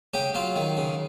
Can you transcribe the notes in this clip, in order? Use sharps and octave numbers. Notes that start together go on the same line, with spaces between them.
C#3 G4
F#3 F4
D#3
C#3